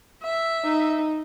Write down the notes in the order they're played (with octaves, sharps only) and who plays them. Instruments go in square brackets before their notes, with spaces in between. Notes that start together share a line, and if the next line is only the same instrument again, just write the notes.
[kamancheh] E5
[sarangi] D#4